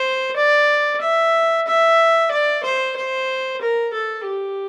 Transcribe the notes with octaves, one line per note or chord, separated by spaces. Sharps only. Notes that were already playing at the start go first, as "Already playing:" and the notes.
Already playing: C5
D5
E5
E5
D5
C5
C5
A#4
A4
G4